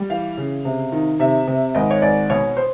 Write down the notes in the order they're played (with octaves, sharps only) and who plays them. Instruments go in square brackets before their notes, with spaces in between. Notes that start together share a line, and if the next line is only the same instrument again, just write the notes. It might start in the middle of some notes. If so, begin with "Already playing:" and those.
Already playing: [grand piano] G3
E3 F5
C#3
C3
D#3
C3 E5
C3
G#1 D#5
C#5
G#1 D5
B2 C#5
C5